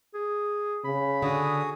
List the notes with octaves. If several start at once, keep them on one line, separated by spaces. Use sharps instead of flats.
G#4
C#3 B5
D3 F#4 G#4 D#6